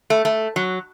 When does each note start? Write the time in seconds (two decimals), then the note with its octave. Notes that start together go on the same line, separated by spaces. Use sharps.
0.10 A3
0.25 A3
0.56 F#3